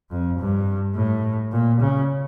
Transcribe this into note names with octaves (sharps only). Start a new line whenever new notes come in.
F2
G2
A2
A#2
C#3